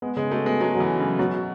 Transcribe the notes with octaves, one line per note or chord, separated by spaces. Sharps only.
G#3 B3
C#3 G#3
A3 F#4
G#3 B3
F#3 B3
E3 F#3
F#4
C#3
F#3
B2 F#3
F#4